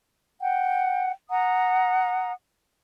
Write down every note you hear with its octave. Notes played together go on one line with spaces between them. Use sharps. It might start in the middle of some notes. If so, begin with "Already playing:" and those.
F#5 G5
F#5 A#5 D#6